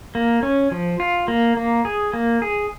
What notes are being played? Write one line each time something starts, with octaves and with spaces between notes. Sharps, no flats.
A#3
C#4
F3
F4
A#3
A#3
G#4
A#3
G#4